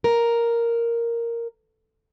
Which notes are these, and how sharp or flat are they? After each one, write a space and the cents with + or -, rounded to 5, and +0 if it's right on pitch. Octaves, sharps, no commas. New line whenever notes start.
A#4 +0